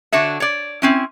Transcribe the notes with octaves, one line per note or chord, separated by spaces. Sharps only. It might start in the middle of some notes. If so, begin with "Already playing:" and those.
D3 D4 F#4 C#5 E5
C#5 D5
C4 C#4 E4